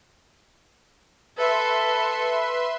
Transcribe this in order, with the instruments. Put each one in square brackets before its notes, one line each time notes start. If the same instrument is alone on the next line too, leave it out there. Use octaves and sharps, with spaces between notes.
[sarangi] A4 [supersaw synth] B4 E5 C6